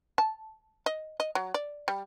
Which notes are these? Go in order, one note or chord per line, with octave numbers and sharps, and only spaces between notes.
A5
D#5
D#5
F#3
D5
G3